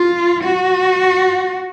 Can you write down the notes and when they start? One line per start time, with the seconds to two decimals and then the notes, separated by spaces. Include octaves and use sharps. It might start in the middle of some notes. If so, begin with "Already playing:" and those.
Already playing: F4
0.43 F#4